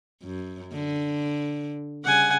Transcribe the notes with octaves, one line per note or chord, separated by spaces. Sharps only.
F#2
D3
C#3 G3 F#5 G#5